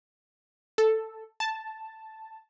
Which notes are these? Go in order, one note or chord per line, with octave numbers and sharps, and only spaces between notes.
A4
A5